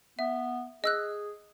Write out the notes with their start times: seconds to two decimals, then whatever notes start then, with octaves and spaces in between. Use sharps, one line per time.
0.19 B3 E5
0.84 G#4 D#5 E6 F#6